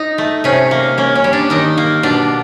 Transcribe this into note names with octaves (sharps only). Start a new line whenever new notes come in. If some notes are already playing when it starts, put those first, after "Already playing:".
Already playing: D#4
A3
C3 C#4
A#3
A#3 C#4
C#4
G3
D4
D#3 D#4
A#3
B2 D4